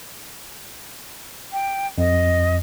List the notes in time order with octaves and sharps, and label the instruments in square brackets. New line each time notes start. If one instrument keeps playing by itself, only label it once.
[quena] G5
[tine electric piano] F2 [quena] D#5